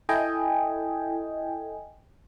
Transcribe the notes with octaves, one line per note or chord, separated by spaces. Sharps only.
E4 A4 D#5 G5 G#5